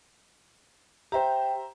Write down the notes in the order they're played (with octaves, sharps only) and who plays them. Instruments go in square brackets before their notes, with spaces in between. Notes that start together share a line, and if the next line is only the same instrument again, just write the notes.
[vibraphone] G4 G5 [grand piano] C5 E5 A#5